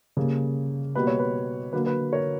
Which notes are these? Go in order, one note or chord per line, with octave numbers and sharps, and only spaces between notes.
C#3 G3 A#3
B2 G3 A#3 B4
C#5
B4
D3 F#3 A#3 B4
B4
A#4 C#5